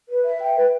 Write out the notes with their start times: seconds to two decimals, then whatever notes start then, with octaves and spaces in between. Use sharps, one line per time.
0.09 B4
0.25 E5
0.41 G5
0.56 B4